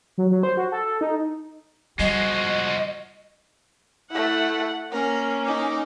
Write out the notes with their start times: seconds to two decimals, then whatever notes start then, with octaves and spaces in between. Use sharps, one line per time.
0.18 F#3
0.31 F#3
0.43 C5
0.57 F#4
0.72 A4
0.85 A4
1.01 D#4
1.99 F3 G3 G#3 F#4 D#5
4.11 A3 E4 F#5
4.92 A#3 C#4 A#4
5.46 D#4 D6